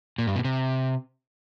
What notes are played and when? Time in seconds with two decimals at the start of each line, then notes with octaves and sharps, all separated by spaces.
0.18 A#2
0.27 G2
0.36 B2
0.44 C3